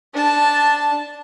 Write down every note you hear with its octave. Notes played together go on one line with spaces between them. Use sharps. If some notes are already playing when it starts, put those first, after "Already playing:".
D4 A5